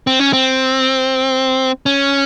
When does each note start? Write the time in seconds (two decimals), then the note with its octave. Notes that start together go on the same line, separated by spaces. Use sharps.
0.07 C4
0.20 C#4
0.33 C4
1.86 C#4